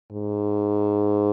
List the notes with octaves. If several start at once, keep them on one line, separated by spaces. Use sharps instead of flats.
G#2